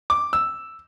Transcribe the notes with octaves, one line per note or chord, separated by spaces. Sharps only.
D6
E6